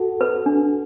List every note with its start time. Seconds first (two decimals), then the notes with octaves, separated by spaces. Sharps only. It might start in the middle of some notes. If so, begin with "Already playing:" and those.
Already playing: F#4 A4
0.21 B4
0.46 D4